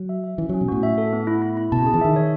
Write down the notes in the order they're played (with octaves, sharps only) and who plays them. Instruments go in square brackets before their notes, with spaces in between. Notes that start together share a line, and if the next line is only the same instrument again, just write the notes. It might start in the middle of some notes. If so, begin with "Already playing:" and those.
Already playing: [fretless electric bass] F#3
[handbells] E5
E5
[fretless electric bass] E3 [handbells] C#4
[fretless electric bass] F#3 [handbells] C#4
[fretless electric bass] B2
[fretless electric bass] A2 [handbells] F#4
[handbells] E5
A4
B3
E4
E4
E4
[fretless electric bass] B2 [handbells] A5
[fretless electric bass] C#3 [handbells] G#4
[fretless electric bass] E3
[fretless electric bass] D#3 [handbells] E5
[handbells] C#5